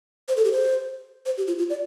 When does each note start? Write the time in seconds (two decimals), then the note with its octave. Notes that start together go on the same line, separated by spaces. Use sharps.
0.28 C5
0.37 A4
0.45 G4
0.52 C5
1.26 C5
1.37 G4
1.47 F4
1.58 F4
1.70 D5